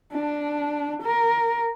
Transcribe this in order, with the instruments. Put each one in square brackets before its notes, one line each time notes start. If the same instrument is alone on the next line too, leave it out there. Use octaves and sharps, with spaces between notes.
[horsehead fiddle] D4
A#4